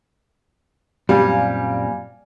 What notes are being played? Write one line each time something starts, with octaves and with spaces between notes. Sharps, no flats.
F#2 A#2 G3 C4 D5 F5 G#5